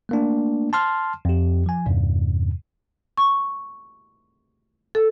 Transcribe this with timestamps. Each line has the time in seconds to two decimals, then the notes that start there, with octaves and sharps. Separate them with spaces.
0.09 A3 A#3 D4
0.73 A5 C6 F6
1.25 F2 G4
1.66 F3 G#5
1.86 E2 G2 C3
3.17 C#6
4.95 A4